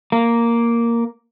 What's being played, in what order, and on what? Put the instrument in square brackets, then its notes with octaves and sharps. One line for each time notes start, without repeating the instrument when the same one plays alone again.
[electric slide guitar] A#3